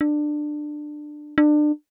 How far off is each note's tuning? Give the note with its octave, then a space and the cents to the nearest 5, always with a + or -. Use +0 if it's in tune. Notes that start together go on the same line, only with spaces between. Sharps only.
D4 +20
D4 +30